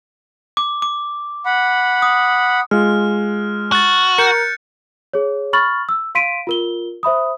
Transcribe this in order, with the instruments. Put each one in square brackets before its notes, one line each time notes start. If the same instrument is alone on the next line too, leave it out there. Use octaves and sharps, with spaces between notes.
[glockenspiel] D6
D6
[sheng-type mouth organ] F#5 B5
[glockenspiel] D#6
[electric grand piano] G#3 F4 [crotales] F6
[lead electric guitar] F#4 [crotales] F#6 A6
[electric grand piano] A#4 [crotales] G6 C#7
[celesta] G#4 C#5
B5 C#6 F6 A6 F#7
E6
F5 C6 B6 D7 D#7
F4 A#4 G7
C5 E5 B5 D#6